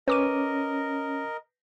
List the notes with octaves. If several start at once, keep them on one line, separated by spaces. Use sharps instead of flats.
C#4 A#4 B4 D#5 D6 D#7